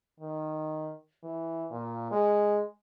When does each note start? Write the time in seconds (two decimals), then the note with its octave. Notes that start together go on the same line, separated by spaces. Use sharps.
0.20 D#3
1.23 E3
1.71 A#2
2.11 G#3